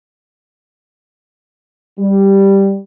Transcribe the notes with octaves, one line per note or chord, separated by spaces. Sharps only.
G3